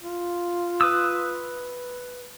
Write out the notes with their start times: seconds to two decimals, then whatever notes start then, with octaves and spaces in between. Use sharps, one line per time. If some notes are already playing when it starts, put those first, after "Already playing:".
0.02 F4
0.81 B4 D#6 E6